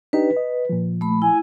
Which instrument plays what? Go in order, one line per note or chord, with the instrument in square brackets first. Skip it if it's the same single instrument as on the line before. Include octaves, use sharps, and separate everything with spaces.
[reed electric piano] D4 D#4 G4 [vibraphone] B4
[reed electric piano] D#5
A#2 F3
[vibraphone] A3 B5
[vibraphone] E4 [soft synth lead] G#5